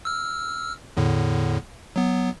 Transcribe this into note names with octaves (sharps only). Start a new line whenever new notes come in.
E6 F6
E2 A2 D3
F#3 B3